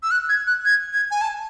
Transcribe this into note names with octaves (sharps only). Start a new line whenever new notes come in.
E6
F#6
G#6
F#6
G#6
G#6
G#5
A5